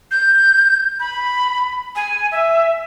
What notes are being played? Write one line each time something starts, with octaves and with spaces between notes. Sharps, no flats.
G6
B5
G#5
E5